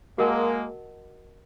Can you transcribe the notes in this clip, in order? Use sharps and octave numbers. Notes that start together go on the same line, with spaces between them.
G#3 A#3 F#4 A#4 D#5 F#5 A5